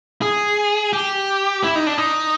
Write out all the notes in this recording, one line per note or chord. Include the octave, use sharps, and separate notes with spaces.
G#4
G4
E4
D#4
D4
D#4